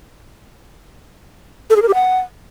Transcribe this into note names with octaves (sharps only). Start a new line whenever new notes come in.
A4
G#4
A#4
G4
F#5